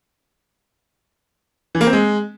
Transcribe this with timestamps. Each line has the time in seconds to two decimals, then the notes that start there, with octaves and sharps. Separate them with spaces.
1.75 E3
1.81 A#3
1.87 C4
1.93 G#3